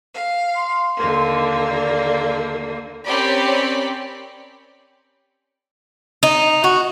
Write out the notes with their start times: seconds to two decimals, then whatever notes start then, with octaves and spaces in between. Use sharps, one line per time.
0.14 F5
0.55 C6
0.96 D#2 D3 A#3
1.68 D5
3.06 C4 C#4 G4 A#4 D5 B5
6.23 D#4
6.64 F#4